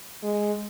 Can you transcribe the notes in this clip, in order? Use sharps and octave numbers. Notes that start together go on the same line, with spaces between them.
G#3